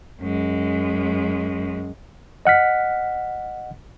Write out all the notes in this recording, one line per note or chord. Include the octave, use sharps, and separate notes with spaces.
F#2 G#3
D#5 F#5 F6 B6